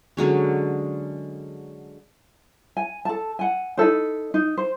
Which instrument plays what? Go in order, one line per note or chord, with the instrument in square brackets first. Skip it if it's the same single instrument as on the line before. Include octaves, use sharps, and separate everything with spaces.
[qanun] D3 F#3 G#3 C#4
[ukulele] G#5
A4 A5
F#5 G#5
D#4 E4 A4 C5
D#4
C5